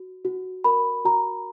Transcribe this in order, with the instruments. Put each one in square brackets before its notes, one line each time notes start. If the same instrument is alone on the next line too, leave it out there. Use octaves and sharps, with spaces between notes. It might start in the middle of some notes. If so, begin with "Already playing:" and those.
Already playing: [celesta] F#4
F#4
A#4 B5
F#4 A#5